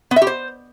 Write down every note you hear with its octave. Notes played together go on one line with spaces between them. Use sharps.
B3
E5
G4
C5